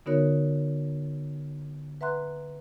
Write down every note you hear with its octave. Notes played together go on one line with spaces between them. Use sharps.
D3 B3 D#4 F#4 A#4 C#5
B4 E5 F#5 A#5 C6 F#6